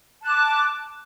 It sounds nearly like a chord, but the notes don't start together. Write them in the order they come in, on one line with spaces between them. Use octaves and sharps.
A5 F#6 D6